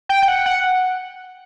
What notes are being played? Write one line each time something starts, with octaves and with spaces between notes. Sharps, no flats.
G5
G5
F#5
F#5